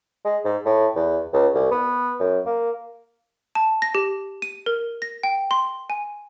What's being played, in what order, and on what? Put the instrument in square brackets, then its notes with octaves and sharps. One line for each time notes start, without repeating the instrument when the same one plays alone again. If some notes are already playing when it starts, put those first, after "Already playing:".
[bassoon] G#3
G#2
A2
E2
C#2
C2
B3
F#2
A#3
[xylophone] A5
A#6
G4
D#7
A#4
A#6
G5
C6
G#5